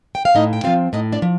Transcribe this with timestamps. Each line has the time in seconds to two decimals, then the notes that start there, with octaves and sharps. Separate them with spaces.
0.15 G5
0.25 F5
0.35 A2 D#4 D#5
0.53 G5
0.64 F3 C4 F4 F5
0.93 A2 D#4 D#5
1.12 D4 D5
1.22 F3